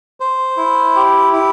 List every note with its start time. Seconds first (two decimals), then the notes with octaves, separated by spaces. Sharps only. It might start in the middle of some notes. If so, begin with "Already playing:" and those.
0.20 C5
0.57 E4
0.96 G4
1.33 E4